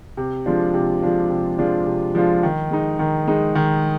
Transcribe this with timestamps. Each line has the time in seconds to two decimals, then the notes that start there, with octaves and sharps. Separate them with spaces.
0.17 C3
0.46 F3 G#3 D4 F4
0.74 C3
1.02 F3 G#3 D4 F4
1.30 C3
1.58 F3 G#3 D4 F4
1.86 C3
2.15 F3 G#3 D4 F4
2.43 D#3
2.71 G#3 D#4
2.99 D#3
3.27 G#3 D#4
3.55 D#3